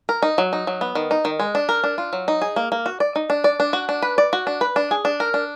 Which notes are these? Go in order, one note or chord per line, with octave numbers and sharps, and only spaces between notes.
A#4
D#4
F#3
D#4
F#3
B3
D#3
D#4
D#3
G#3
D4
A#4
D4
F4
F#3
D#4
G#4
A#3
A#3
F#4
D5
D#4
D4
D5
D4
F#4
D4
B4
D5
F#4
D4
B4
D4
G#4
D4
A#4
D4